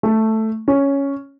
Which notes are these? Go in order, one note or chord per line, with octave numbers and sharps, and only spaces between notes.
A3
C#4